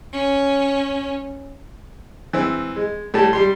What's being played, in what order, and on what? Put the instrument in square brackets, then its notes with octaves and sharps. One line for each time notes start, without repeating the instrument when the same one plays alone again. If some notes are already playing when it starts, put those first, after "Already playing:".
[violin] C#4
[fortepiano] E3 C4
G#3
A2 G3 A5
G3 C6